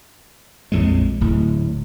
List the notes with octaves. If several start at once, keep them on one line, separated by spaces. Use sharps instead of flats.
A#1 F2 A2 G#3
D1 A2